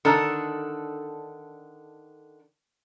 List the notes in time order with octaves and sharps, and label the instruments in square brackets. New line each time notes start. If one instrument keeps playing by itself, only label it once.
[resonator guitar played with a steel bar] D3 D#3 D4 A4